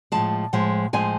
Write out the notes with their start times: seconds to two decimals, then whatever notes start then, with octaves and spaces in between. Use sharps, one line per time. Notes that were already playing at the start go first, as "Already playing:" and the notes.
0.12 A2 F3 G#3 A5
0.53 A2 F3 G#3
0.93 A2 F3 G#3 G#5